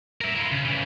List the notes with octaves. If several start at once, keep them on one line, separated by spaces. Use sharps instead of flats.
A#4 E5
E4 F4
C#3
C#3 E3